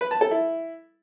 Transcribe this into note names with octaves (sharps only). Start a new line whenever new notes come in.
B4
A5
A4
E4